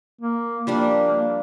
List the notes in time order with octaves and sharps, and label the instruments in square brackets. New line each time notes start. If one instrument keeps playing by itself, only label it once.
[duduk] A#3
[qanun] F3 G3 D4 [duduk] A#3